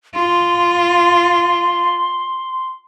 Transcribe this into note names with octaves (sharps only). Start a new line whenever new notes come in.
F4 C6